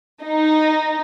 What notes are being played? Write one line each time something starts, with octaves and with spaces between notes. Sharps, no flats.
D#4